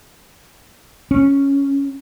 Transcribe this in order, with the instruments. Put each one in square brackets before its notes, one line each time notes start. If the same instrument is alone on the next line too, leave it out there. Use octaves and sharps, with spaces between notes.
[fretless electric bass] C#4